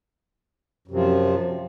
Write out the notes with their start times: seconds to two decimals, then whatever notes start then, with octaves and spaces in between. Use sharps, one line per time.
0.88 F#2
0.91 C3
0.94 F3